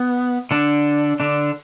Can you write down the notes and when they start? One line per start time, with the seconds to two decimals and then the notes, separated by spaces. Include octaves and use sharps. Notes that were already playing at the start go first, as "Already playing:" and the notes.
Already playing: B3
0.51 D3 D4
1.20 D3 D4